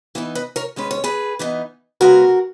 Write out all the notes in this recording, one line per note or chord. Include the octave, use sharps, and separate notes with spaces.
E3 B3 D#4 E4
B4 D#5
A#4 C#5
D#3 G#3 C#4 B4
C#5
G#4 B4
E3 B3 D#4
C#3 G#3 B3 F#4 A#4